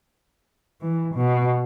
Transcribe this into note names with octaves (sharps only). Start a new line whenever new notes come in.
E3
B2